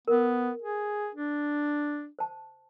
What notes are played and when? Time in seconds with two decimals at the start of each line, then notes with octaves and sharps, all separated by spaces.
0.08 B3 A#4
0.62 G#4
1.15 D4
2.19 C5 A5